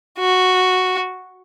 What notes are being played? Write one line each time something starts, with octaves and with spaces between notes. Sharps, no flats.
F#4